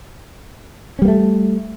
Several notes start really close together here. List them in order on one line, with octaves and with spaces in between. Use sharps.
C#4 G3 A#3 A3